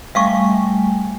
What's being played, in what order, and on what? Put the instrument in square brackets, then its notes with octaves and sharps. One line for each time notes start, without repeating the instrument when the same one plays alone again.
[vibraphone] G3 A3 G#5 [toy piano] E5 F5 C#6